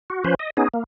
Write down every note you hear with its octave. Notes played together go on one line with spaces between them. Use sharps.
F#4
F3 C#4 B4 C5
D#5
B3 C#4 D#4 G#4
A#3